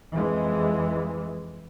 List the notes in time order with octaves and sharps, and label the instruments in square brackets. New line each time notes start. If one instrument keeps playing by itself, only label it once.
[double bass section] F2 E3 G#3